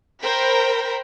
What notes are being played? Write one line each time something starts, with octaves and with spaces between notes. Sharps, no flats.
A#4 C5 G5 B5